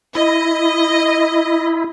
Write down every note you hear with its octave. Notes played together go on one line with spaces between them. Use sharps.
E4 D#5